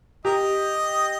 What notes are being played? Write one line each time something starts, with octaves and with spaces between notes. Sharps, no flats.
G4 A#4 D#5